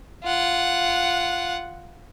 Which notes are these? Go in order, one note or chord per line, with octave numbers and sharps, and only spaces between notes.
F4 F#5